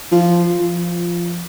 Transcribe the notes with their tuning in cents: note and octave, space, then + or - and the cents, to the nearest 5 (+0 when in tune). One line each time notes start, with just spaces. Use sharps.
F3 -5
F3 -15